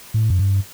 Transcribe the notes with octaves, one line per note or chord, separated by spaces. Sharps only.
A2
F#2
G2